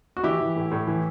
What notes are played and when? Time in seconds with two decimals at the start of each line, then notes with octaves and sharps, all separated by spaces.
0.17 F#4
0.24 E3 E4 G4
0.40 E3
0.56 A2
0.72 A2
0.87 E3